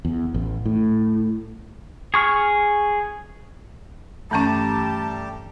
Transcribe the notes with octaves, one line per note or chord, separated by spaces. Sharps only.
E2
A1
A2
G#4 C#6 F6
G2 E3 G3 A3 C#4 G4 A5 A#5